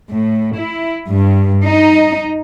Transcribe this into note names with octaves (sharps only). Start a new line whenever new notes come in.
A2
E4
G2
D#4